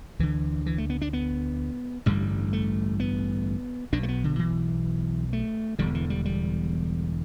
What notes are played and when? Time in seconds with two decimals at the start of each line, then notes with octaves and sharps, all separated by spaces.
0.19 D2 D3 E3
0.66 E3
0.78 A3
0.90 B3
1.02 D4
1.13 B3
2.06 A1 G2 D3 G3
2.53 A3
3.00 B3
3.93 B1 B2 D4
4.03 A3
4.08 B3
4.24 D3
4.39 E3
5.33 A3
5.79 E1 E2 D3 G3
5.95 E3
6.10 G3
6.25 G3